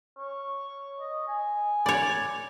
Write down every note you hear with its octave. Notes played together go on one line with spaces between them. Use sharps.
C#5
D#5
G#5
C#5 D5